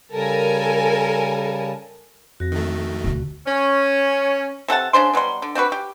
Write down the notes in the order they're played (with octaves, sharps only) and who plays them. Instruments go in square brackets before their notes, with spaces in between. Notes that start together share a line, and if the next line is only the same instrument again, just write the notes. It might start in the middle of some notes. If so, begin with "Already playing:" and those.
[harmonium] C#3 G3 A5 [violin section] A4 A#4 G#5
[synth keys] F2 A#6 [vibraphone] F#4
[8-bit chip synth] D#3 A3
[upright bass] D2 B2
[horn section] C#4
[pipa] C3 A4 F#5 A5
C#3 D4 C5 C6
B2 F#3 G3 C6
D3
C4 D4 F#4 B4
G4